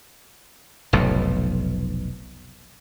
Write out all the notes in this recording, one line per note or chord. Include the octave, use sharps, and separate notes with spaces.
F1 B1 F2 A2